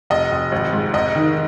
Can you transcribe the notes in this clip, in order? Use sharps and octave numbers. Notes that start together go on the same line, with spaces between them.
F1 D#5
F1
G#1
G#2
F1 D#5
D#3